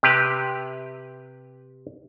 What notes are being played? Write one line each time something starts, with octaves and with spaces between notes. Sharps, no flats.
C3 G4 B4